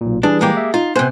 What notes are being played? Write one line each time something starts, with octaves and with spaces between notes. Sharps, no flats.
B1 A#2
E3 G3 D4 G#4
G#3 A#3 G4
E5
D#4 F4
C3 B3 C5 G#5 F#6